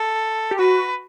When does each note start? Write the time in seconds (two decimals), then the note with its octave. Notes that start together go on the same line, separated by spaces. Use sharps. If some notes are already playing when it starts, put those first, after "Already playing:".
Already playing: A4
0.51 G4
0.59 F#4 B4